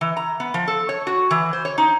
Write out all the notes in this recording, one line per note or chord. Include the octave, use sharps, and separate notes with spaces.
E3
A#5
B3
F3
A4
C#5
F#4
E3
C5
C#5
D#4